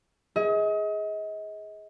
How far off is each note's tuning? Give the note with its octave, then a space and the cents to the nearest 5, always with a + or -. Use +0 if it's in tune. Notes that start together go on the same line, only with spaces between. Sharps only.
G#4 +0 D#5 +35